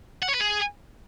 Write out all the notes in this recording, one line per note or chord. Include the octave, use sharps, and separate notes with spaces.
F#5
C#5
B4
G#4